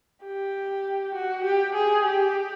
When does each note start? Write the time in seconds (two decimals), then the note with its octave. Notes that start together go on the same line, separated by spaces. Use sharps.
0.23 G4
1.15 F#4
1.44 G4
1.75 G#4
2.05 G4